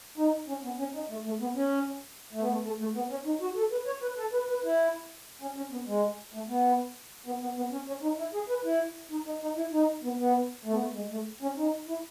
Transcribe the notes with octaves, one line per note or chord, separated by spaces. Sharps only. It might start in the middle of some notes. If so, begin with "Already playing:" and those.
D#4
C#4
B3
C#4
D#4
A3
A3
B3
C#4
A3
B3
A3
A3
A3
B3
C#4
D#4
F#4
A4
B4
C#5
B4
A4
B4
B4
E4
C#4
C#4
B3
G#3
A3
B3
B3
B3
B3
C#4
C#4
D#4
E4
G#4
B4
E4
D#4
D#4
D#4
E4
D#4
B3
B3
A3
B3
A3
G#3
A3
C#4
D#4
E4